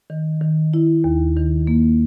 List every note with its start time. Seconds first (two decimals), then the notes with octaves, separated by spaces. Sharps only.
0.10 D#3
0.41 D#3
0.74 E4
1.04 D#2
1.36 D#3
1.67 A#3